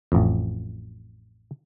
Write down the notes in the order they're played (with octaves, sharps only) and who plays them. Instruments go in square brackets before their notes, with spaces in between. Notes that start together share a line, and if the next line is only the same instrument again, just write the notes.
[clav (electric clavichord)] A1 F2